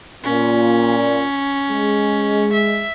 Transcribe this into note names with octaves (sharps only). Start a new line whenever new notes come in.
A#2 C#4
G#3
E5